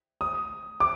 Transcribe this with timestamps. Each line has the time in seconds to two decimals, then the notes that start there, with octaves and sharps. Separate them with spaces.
0.21 D#6
0.80 D6